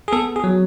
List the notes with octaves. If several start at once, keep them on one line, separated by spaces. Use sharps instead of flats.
G#4
B3 A4
G#4
F#3